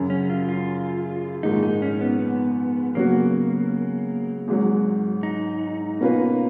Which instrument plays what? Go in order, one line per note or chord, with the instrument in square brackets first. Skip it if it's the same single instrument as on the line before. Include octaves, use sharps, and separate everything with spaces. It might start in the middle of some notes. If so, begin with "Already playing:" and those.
Already playing: [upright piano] F#2 C#3 F#3
[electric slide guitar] C#4
F4
F4
[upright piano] A#1 G#2 D#3 [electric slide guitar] D#4
[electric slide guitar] D#4
C#4
B3
B3
[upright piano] C#3 F#3 B3 F#4 [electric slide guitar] A#3
[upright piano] G#1 G#2 F#3
[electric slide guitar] D#4
[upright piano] B2 A#3 C#4 F4 B4